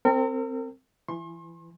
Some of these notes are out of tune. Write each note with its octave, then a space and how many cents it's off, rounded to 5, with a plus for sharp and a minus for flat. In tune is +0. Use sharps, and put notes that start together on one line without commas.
C4 +0 A#4 -40
E3 +25 C6 +45